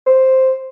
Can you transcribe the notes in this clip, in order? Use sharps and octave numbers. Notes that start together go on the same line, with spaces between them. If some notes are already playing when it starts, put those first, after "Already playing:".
C5